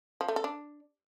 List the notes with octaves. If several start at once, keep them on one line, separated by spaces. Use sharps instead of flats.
F3
A3
A4
D4